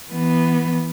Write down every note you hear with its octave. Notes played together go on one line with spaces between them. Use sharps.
E3 B3